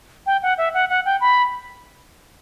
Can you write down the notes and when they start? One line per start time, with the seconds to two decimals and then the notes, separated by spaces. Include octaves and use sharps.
0.26 G5
0.42 F#5
0.58 E5
0.74 F#5
0.89 F#5
1.05 G5
1.21 B5